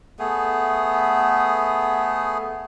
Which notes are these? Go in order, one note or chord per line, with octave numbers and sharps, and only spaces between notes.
A3 B3 G#4